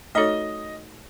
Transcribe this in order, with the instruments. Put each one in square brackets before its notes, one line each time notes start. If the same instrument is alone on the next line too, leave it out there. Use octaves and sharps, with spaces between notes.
[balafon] A3 D#4 F#4 A4 C#5 [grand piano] D#5